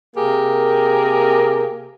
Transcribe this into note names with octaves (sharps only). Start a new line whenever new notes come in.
C3 A#3 G4 G#4 A#4